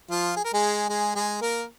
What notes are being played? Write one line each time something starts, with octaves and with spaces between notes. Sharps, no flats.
F3 F4
G#4
A#4
G#3 G#4
G#3 G#4
G#3 G#4
A#3 A#4